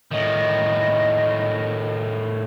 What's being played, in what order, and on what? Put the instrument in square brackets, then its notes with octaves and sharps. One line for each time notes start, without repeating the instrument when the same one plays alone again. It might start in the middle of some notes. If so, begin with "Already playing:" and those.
[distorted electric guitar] A2 D#3 [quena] D#5